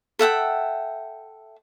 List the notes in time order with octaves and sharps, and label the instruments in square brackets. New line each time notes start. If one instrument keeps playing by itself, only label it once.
[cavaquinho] A4 E5 F#5 G5